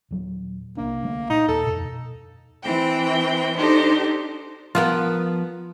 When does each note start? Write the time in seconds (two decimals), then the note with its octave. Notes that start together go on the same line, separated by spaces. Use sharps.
0.11 D#1 F#3
0.77 C2 A#3 D4
1.03 D2 G#3 A3
1.30 A#2 D#4
1.48 D#2 A4
1.66 F2 B2
2.62 E3 C4 G5
3.57 D4 D#4 G4 A4 C5
4.75 F3 B3 F4 A#4 F#5